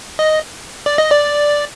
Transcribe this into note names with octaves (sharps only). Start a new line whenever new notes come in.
D#5
D5
D#5
D5